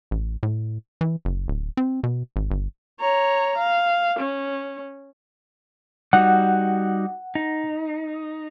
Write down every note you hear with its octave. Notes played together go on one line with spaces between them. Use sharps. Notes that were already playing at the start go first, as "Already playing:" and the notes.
A1
A2
E3
F#1
D1
C4
B2
G#1
G1
C#5 A#5
F5
C#4
G3 D#4 F#4 F#5
D#4